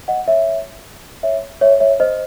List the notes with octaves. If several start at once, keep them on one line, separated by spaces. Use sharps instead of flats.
D#5 F#5
C#5 E5
C#5 E5
C#5 E5
C#5 E5
C5 D#5